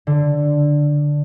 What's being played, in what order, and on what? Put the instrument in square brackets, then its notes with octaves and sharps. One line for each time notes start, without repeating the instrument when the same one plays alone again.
[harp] D3